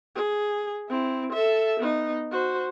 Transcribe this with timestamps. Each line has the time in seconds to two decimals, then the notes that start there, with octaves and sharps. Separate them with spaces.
0.15 G#4
0.89 C4 E4
1.32 A4 E5
1.80 B3 D#4
2.31 F#4 C5